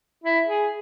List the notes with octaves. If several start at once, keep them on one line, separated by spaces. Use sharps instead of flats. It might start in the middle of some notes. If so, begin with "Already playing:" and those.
E4
G#4